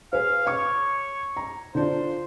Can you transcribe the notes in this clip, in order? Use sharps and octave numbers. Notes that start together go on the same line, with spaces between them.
G#4 B4 F5
C#5 C#6 D6
A#5
D3 D4 F4 C5